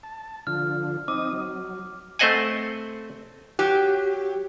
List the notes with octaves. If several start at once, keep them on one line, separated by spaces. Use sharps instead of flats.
A5
D3 F3 F6
C4 D#4 D6 D#6
F#3
A3 C4 C5 D#5 F#5 G#5
F#3 G4